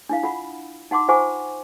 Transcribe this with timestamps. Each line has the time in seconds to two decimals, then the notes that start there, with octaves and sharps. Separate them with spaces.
0.09 D4 E4 F5
0.23 F4 F#5 B5
0.91 D#4 F#5 C6 D6
1.08 F4 C5 F#5 G#5 C#6 D6